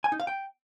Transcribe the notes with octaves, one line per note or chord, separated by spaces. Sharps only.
G#5
D#4
F5
G5